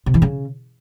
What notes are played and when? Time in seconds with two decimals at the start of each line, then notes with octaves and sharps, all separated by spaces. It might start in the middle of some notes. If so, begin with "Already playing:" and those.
0.06 C3
0.14 E3
0.22 C#3